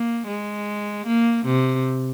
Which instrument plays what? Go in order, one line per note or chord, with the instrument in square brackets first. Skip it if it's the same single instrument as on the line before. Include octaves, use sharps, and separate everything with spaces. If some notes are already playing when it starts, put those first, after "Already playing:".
Already playing: [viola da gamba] A#3
G#3
A#3
C3